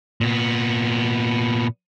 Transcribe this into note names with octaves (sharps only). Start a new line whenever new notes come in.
A#2 B3